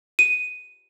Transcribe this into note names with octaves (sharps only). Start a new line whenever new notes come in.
D#7